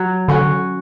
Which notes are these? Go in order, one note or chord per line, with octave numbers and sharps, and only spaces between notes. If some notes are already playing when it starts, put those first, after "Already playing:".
Already playing: F#3
D3 C#4 F#4